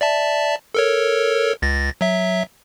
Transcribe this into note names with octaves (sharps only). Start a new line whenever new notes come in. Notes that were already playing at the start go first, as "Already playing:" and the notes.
D5 E5 A5
A4 A#4 C#5
C#2 A6 A#6
F#3 E5